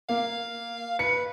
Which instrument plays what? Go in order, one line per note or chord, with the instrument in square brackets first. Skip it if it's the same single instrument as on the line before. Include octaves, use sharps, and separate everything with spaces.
[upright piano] A#3 [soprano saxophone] F5
[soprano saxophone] B4 [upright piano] C#7